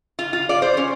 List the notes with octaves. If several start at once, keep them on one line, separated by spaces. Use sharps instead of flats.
F4
F4
D5
C5
C#4